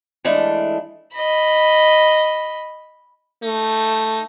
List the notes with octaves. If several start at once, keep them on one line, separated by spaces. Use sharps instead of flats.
E3 G#3 A3 D4
D#5 B5
A3 D#4